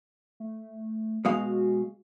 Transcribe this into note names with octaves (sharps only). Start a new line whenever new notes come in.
A3
B2 G#3 F#4 F5